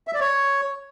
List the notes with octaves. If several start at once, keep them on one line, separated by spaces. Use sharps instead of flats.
E5
D5
C#5